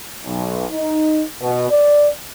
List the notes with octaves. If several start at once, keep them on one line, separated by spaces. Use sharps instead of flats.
B1
D#4
B2
D5